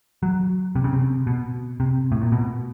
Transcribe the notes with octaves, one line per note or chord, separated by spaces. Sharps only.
F#3
C3
C#3
C3
B2
C3
A2
A#2
B2